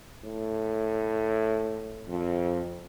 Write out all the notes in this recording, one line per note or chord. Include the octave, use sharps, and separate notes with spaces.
A2
F2